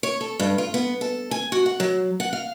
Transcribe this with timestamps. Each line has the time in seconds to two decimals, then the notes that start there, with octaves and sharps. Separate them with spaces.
0.03 C#5
0.21 A4
0.40 G2
0.58 F4
0.74 B3
1.01 A4
1.31 G#5
1.52 F#4
1.66 F#5
1.80 F#3
2.20 F#5
2.33 F5